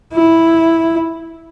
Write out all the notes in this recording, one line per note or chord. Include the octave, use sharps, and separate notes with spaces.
E4